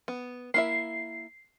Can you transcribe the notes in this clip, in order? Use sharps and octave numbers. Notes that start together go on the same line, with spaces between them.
B3
A#3 E4 E5 C7